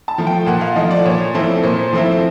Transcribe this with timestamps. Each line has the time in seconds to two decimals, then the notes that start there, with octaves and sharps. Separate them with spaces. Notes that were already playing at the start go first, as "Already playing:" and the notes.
0.08 A5
0.18 F3 A3
0.27 G5
0.46 A#2 F#5
0.61 F5
0.75 F3 A3 D#5
0.91 D5
1.05 A#2 C#5
1.35 F3 A3 C4 E4
1.63 A#2 C5
1.93 F3 A3 C4 E4